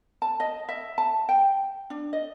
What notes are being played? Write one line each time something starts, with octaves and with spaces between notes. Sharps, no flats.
A5
D#5
E5
A5
G5
D4
D#5